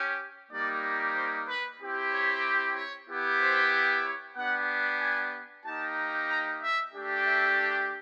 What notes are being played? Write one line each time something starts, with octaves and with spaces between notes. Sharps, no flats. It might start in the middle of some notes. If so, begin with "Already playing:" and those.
Already playing: C#4 G4
G3 A#3 D#4 G4 D5
C5
B4
C4 E4 G4
C#5
C#5
B3 E4 G4
C5
C#5
B3 D4 G4 F#5
G#5
A#3 D#4 G4 A5
A#5
E5
A3 D4 G4
E5